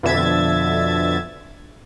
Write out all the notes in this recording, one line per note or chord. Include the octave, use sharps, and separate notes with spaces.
F2 B2 D3 E5 G#6 A6